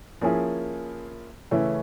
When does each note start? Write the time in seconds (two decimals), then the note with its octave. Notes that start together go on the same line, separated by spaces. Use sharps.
0.21 F3 A#3 C#4 E4 G#4
1.51 C#3 E3 A3 C#4 E4